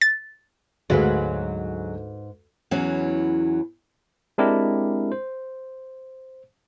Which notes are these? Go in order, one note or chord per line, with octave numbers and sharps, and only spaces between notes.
A6
D2 G#2 F#3 G#3 B4 F5
E2 E3 F#3 C#4
G#3 C4 D4 E4 G4 A#4
C5